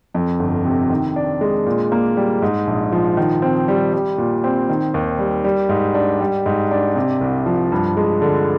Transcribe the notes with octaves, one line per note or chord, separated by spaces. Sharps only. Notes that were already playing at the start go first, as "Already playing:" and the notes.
F2
G1
C3
D#3
D4
G#3
A#2
A#3
G3
G#2
A#1
F3
D#3
C4
G3
G3
A#2
C4
D#3
D#2
G3
G3
G#2
D4
G3
G#2
D4
C3
C2
F3
G2
G#3
D3